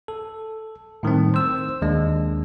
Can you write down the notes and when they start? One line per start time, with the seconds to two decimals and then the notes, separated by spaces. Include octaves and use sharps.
0.08 A4
1.03 A2 D#3 G3 C4
1.34 C5 E6
1.82 D#2 G#3 D4